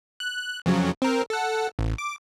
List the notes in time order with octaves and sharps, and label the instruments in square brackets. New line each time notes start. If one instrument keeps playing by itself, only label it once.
[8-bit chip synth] F#6
F2 C#3 F#3
C4 A#4
A4 F#5
A1
D6